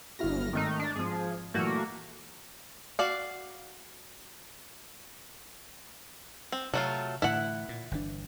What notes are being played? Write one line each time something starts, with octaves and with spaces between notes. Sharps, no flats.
G1 E4 F#4 F6 A#6
G#1 D#3 A3 D#4 D#5 F6
D4
G#1 F3 G#4
A#2 E3 F#3 A3 A#3 F#4
F#4 D5 F5
C4
C3 F#3 A3 F4
A2 D3 E3 E4 F#5
A#2
G1 E3 D4